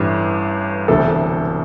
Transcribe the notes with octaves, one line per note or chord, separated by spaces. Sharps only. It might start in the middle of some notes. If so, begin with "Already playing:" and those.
Already playing: A1 G2 E3
E1 D2 C3 E3 A4